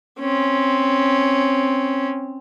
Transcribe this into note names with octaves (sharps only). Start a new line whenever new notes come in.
C4 C#4